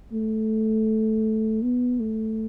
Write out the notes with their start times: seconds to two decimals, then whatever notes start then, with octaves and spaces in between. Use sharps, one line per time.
0.12 A3
1.62 B3
2.00 A3